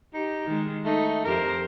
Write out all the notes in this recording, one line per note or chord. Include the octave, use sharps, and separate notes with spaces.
D#4 G4
D#3 G#3
A3 D#4
F2 G4 A#4 C5